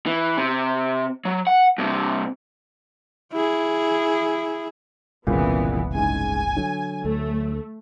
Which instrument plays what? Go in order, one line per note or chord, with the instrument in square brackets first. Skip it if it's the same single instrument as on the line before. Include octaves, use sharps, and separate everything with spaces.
[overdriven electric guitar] E3
C3
F#3
F#5
G2 C3
[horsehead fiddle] E4 G#4
[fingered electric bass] F#1 C2 [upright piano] A#2 C#3 G#3 [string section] E3 B3
[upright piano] C#2 G#2 [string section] G#5
[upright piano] D3 F#3
[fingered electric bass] D2 [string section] A3